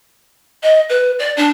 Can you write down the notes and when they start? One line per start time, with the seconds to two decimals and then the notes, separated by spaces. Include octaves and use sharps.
0.63 D#5
0.89 B4
1.19 D5
1.37 D4